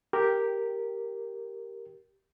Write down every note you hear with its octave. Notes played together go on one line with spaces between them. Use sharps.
G4 A#4